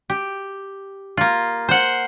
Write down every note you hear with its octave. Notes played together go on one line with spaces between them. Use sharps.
G4
A#3 F4
C5 F#5